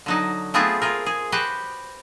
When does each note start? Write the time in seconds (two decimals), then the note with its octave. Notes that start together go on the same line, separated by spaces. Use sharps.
0.06 D3 F#3 D#4
0.54 A3 B3 C4 F4 G#4 E5
0.82 F4 G#4 A#4
1.06 G#4
1.32 F#4 G4 B4 C5